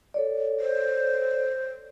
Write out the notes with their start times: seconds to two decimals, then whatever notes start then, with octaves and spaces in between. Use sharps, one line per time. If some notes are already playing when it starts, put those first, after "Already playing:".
0.14 A4 C#5 D5
0.60 C5